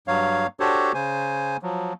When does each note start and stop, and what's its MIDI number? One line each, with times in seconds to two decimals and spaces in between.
0.08 0.47 43
0.08 0.47 54
0.08 0.47 73
0.08 0.47 77
0.60 0.92 62
0.60 0.92 66
0.60 0.92 67
0.60 0.92 69
0.60 0.92 72
0.60 0.92 73
0.94 1.57 49
0.94 1.57 72
0.94 1.57 80
1.62 1.93 53
1.62 1.93 54